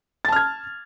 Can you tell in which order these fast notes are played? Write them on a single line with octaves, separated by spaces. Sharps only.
A6 A5 F6 G#6